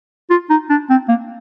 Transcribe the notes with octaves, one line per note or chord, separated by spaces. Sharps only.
F4
D#4
D4
C4
A#3